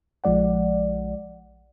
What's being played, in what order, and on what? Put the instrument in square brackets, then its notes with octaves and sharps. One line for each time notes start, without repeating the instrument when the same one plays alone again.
[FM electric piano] A#1 F3 G#3 D5 F#5